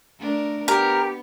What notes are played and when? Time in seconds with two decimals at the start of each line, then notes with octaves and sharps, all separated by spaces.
0.19 A3 D4 A#4
0.68 B3 G4 A#4